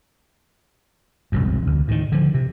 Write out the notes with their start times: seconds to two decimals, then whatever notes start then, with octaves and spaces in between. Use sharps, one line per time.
1.32 E1 C2 F#2
1.67 D2
1.88 A2 D#3
2.12 D3 F3
2.34 C3